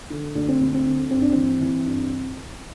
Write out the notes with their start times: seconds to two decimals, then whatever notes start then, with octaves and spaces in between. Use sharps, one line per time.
0.10 D3
0.35 D2 D4
0.48 C4
0.60 D2
0.74 C4
0.85 D3
1.11 G2 C4
1.22 D4
1.33 E3 C4
1.61 E3
1.86 G2